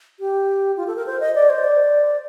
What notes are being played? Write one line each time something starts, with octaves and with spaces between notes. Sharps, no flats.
G4
F4
A4
A#4
C5
D#5
D5
C5
D5